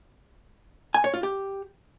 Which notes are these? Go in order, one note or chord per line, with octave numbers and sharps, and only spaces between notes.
G#5
C#5
F4
G4